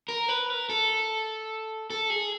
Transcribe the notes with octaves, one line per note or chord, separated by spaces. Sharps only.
A#4
B4
A#4
A4
A4
G#4